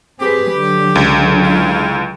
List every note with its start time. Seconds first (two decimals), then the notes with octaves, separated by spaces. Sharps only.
0.20 C4 G4 G#4 B4
0.51 D3 F#3
0.95 C#2
1.44 E4 F4